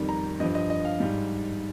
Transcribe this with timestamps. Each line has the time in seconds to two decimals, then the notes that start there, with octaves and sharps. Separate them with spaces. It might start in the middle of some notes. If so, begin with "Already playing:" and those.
Already playing: F2 D#3 G3
0.09 A#5
0.40 G2 D#5
0.44 F3
0.55 D#5
0.70 D#5
0.85 F5
1.00 G#2 G3